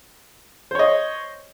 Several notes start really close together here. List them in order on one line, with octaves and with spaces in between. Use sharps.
C5 C#5 D#5